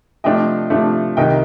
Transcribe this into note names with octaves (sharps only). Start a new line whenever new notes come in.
C3 F3 A3 D4 F4 D#5 G5
C3 F3 A3 D4 F4
C2 C3 D#3 D#5 G5